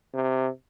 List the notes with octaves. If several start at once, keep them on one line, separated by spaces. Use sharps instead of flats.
C3